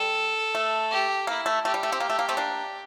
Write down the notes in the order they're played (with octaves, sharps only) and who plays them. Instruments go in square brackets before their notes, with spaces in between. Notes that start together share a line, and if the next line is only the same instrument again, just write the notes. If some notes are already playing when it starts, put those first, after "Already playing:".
Already playing: [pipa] G3 [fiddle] A4
[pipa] A3
[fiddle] G4
[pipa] A#3 [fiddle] E4
[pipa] A3
[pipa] A3 [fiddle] G4
[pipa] G3
A3
C4
A#3
A3
A#3
A3 C4
A#3 D4